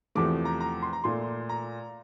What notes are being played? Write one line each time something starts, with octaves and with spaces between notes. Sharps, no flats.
E2 C3 F3 A3 D6
A#5
A#5
C6
A#5
A#2 A3 C6
A#5